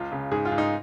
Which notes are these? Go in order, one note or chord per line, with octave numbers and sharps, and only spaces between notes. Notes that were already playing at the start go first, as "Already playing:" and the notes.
Already playing: C#2 F4
C#3
G#2 G#4
F4
G#2
D#4